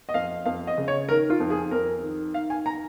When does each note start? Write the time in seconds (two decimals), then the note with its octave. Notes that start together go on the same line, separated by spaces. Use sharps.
0.09 D#5
0.14 F2 F5
0.46 F2 F5
0.67 D#5
0.78 C#3
0.88 C#5
1.09 D#3 A#4
1.30 F4
1.40 F2
1.50 G#4
1.71 F2 A#4
2.03 D#3
2.34 D#3 F5
2.50 G#5
2.66 A#5